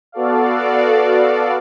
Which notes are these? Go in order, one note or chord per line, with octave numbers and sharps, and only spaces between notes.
B3 F#4 A4 D5 F5